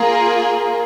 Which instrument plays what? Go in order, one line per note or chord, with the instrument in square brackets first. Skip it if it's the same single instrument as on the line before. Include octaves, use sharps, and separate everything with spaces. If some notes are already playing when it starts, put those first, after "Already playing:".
Already playing: [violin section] A#3 F4 G#4